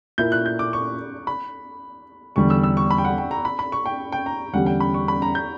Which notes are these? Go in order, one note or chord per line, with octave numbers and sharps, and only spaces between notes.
A#2 A#3 E4 A#4 G6
F#6
G6
D6
C#6
B5
E2 D3 G3 C#6
E6
E6
C#6
B5
G5
F#5
G5
A#5
B5
B5
C#6
G5
G5
A#5
E2 D3 G3 C#4 G4 F#5
G5
B5
C#6
B5
A#5
G6